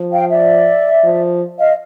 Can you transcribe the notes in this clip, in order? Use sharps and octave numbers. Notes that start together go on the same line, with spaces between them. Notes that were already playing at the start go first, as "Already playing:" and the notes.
Already playing: F3
F5 G5
D5 E5
F3
D#5 F5